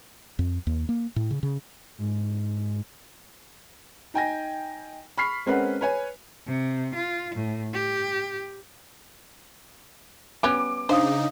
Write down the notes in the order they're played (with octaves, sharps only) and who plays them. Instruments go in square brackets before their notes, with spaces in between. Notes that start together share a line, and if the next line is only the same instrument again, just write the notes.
[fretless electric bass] F2
D#2
A#3
A2
C#3
C#3
[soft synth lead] G#2
[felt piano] D#4 G5 G#5 A#6
B5 C#6 F6 B6 C7
G#3 C4 C#4 A#4 B4 F#5
B4 C#5 G#5
[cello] C3
F4
A2
G4
[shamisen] G3 B3 C#4 [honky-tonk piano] D6
[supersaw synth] C#3 D#4 [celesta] D4 F5 D#6 [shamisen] C5